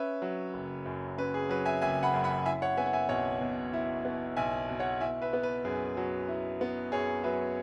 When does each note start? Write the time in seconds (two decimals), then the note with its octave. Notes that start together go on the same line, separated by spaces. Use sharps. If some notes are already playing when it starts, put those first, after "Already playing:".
Already playing: C#4 B4 E5
0.22 F#3
0.54 F#1
0.86 F#2
1.18 C#4 B4
1.34 G#4
1.49 F#3 B4
1.65 E5 G#5
1.82 F#1 E5 G#5
2.03 F#5 B5
2.14 F#2
2.24 F#5 B5
2.45 E4 E5 G#5
2.62 C#5 F#5
2.77 B3 E5 G#5
2.86 F#5
2.93 E5 G#5
3.09 B1 C#5 F#5
3.41 B2
3.73 E4
4.05 B3
4.37 B1 E5 G#5
4.69 B2
4.79 C#5 F#5
5.00 E4 E5 G#5
5.22 B4 E5
5.33 B3
5.43 B4
5.65 F#2 G#4
5.97 F#3
6.29 E4
6.61 B3
6.92 F#2 G#4 C#5
7.24 F#3 B4 E5